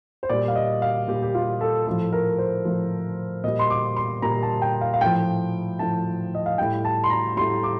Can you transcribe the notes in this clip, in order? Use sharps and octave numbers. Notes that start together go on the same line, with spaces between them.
C5
A#2 G3 D5
F5
D#5
F5
A#2 G3 G4
G4
F4
A4
A2 F3 A4
A#4
C5
A2 F3
A#2 G3 D#5
C6
D6
C6
A#2 G3 A#5
A5
G5
F5
F5
A2 F3 G5
A2 F3 A5
D#5
F5
A2 G3 G5
A5
C6
A#5
A2 G3 C6
D6